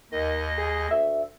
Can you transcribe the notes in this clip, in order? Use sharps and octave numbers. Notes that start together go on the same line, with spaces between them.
D#2 D#3 D#5
G#4
D2 E5